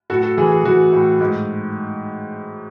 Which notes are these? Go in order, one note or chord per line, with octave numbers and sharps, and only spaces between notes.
A2 F#4 A4
F#4 A4
E3 G#4
G#4
E3 F#4
A2
G#2